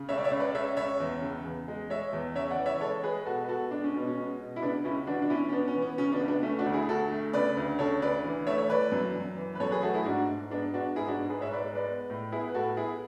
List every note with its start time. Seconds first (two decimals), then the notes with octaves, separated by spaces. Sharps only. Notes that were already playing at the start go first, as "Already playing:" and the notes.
Already playing: C#3
0.09 C#2 C#5 E5
0.18 D5
0.24 C#5 E5
0.31 C#2
0.39 B4 D5
0.54 C#2 C#5 E5
0.77 C#2 C#5 E5
1.00 E2
1.22 C#3
1.45 E2
1.68 G#3
1.90 G#3 C#5 E5
2.13 E2
2.35 C#3 C#5 E5
2.51 D5 F#5
2.58 E3
2.66 C#5 E5
2.81 G#3 A4 C#5
3.03 G#3 G#4 B4
3.26 B2 F#4 A4
3.44 B4
3.49 B3 F#4 A4
3.71 G#3 D4
3.84 C#4
3.94 B2 B3
4.07 C#4
4.17 G#3
4.40 B2
4.56 E4
4.62 C#3 B3 D4
4.84 C#2 C#4 E4
5.07 E3 D4 F#4
5.22 D4
5.30 B3 C#4 E4
5.49 C#4
5.53 B3 D4
5.68 C#4
5.75 E3
5.82 B3
5.98 C#3 C#4
6.12 B3 D4
6.21 C#2
6.28 B3 D4
6.43 A3 C#4
6.59 D4 F#4
6.66 D2
6.73 E4 G#4
6.89 D2 F#4 A4
7.11 A3
7.33 C#3 B4 D5
7.57 D2
7.79 C#3 A4 C#5
8.02 D2 B4 D5
8.24 E3
8.47 A3 C#5 E5
8.58 C#5
8.70 E3 B4 D5
8.92 F#2
9.16 F#2
9.37 E3
9.55 B4
9.60 F#2 A4 C#5
9.71 G#4 B4
9.82 A3 F#4 A4
9.94 E4 G#4
10.05 G#2 D4 F#4
10.28 G#2
10.50 G#3 B3 D4
10.73 B3 D4 F#4
10.96 G#2 E4 G#4
11.08 D4 F#4
11.19 G#2
11.30 G#4 B4
11.41 G#2 C#5 E5
11.52 B4 D5
11.64 G#3
11.75 B4 D5
11.87 B3
12.10 A2
12.32 B3 E4 G#4
12.48 B4
12.54 A2 F#4 A4
12.77 B3 E4 G#4